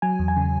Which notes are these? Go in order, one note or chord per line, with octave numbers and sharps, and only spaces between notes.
F#3 G#5
E2
G#5
C#3